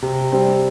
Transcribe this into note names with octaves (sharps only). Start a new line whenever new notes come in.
C3
G3 C4